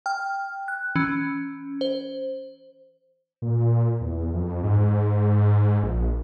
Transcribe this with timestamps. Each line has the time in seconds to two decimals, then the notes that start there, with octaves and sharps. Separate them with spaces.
0.06 G5 F6
0.68 F#6
0.96 E3 C#4
1.81 C5
3.42 A#2
4.01 E2
4.34 F2
4.63 G#2
5.83 A#1